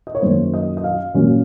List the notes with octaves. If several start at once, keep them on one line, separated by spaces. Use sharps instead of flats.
D#5
C#5
F#2 D#3 F#3 A#3 C5
D#5
D#5
F5
A#2 F#3 C#4